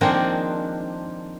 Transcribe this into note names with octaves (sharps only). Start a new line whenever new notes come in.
D#3 F3 G#3 A#3 C4 D4